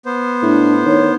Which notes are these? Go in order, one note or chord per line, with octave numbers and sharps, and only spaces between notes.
B3 C5
A2 D4
D#3 C#5